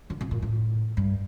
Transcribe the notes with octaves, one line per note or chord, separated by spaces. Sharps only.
D3
C3
A#2
A2
G2